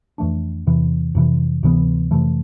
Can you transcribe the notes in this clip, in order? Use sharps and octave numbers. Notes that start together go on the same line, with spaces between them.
F2 E3 A3 D4
E2 C3 E3
F2 C3 E3
D2 C3 E3 B3
F2 C3 E3 A3